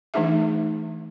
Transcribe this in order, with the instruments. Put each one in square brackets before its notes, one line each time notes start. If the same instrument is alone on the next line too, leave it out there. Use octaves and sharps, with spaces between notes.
[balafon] E3 A3 D4 D#4 G#4 E5